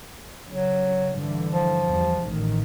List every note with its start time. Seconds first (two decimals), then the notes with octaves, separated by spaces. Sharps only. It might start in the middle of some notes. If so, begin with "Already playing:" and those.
0.50 C#3 F#3
1.13 G2 D3 E3
1.51 F3
1.87 E2 G3
2.26 A1 D#3